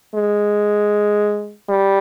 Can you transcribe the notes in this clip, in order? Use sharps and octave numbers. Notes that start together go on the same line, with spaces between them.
G#3
G3